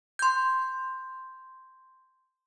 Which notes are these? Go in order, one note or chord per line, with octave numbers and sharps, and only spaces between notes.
C6 G6